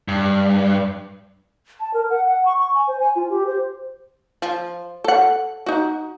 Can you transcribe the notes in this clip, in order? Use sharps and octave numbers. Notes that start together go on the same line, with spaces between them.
G2
A5
A#4
F#5
F#5
C#6
C#6
G#5
C5
G#5
F4
G4
C5
F3
A4 F#5
D#4 F#4